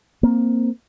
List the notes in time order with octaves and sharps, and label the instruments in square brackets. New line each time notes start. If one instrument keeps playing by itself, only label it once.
[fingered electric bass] A#3 C4